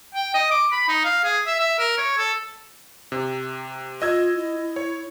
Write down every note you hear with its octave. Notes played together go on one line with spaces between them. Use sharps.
G5
D#5
D6
B5
D#4
F5
G#4
E5
E5
A#4
C#5
A4
C3
F4 D#5 E6 G#6
E4
C#5